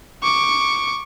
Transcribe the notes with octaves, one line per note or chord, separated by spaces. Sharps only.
C#6 D6